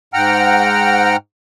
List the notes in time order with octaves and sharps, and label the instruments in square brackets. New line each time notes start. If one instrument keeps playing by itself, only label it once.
[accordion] G#2 F#5 G5 A#5 F6